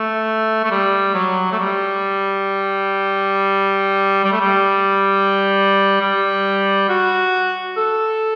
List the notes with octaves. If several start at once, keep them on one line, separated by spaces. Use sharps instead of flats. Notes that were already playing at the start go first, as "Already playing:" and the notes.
Already playing: A3
A3
G3
F#3
A3
G3
G3
A3
G3
G3
F#4
A4